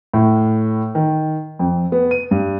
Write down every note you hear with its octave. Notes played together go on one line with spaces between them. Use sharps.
A2
D#3
F2
B3
D#7
G2